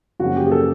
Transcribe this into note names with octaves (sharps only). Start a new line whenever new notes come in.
F#2 C#3 F3 A#3 C#4 F#4
G4
G#4
A4